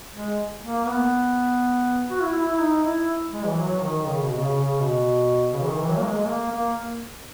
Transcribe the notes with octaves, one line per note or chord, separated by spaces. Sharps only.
G#3
A#3
B3
F#4
E4
E4
E4
D#4
E4
G#3
E3
F#3
D#3
C#3
B2
C#3
C#3
B2
C#3
E3
D#3
E3
F#3
A#3
G#3
G#3
A#3
A#3